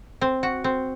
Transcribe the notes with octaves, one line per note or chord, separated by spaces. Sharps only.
C4
F#4
C4